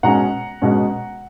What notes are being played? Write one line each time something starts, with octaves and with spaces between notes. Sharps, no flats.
B2 G#3 C#4 F#5 A#5
B2 G#3 C#4